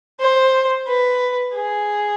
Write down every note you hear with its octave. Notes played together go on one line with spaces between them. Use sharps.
C5
B4
G#4